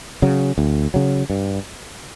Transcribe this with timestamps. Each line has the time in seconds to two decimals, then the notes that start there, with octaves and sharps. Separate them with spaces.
0.22 C#3 F#3
0.58 D2
0.94 C#3 F#3
1.30 G2